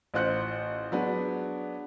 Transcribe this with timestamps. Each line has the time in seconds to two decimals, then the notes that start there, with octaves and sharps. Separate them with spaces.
0.14 A1 F4 C5 F#6 G6 C#7
0.92 F#3 G#3 B3 D4